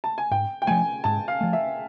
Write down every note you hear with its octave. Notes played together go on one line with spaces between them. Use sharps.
A5
G#5
G#2 G5
G5
F3 A3 G#5
G#2 A5
F5
F3 A3
E5